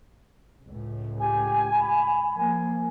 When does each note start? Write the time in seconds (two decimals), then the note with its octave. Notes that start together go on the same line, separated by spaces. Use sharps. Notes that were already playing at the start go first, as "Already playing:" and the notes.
0.65 C#2 A2
1.20 G4 G#5
1.73 B5
2.35 F3 A#3 G#5